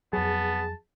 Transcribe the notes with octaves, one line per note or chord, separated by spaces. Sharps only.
F2 F#3 B3 G#4 A5